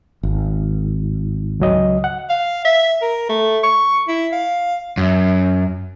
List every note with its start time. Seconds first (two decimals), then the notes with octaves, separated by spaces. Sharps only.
0.23 G#1
1.60 C#2 F#3 D#5
2.04 F#5
2.30 F5
2.65 E5
3.02 A#4
3.29 A3
3.64 C#6
4.08 E4
4.33 F5
4.97 F#2